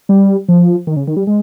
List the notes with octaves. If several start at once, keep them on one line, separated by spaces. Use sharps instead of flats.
G3
F3
D#3
C#3
D#3
G3
G#3